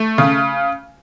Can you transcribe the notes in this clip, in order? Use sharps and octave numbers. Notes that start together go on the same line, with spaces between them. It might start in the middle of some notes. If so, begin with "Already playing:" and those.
Already playing: A3
C#3